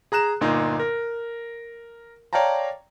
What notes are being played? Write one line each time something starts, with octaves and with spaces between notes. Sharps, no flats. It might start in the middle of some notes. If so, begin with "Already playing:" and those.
G#4 A#5 F#6 E7
G1 A#2 D#4
A#4
C#5 D5 F5 G5 A5 A#5